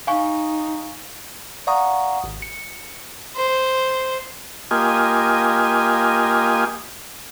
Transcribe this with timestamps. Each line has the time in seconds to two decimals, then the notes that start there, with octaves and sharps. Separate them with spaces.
0.07 D#4 F5 G#5 C#6
1.67 D5 F5 F#5 A#5 C#6 D#6
2.24 G#1
2.42 C#7
3.36 C5
4.71 A#3 F4 G4 D#5 G#5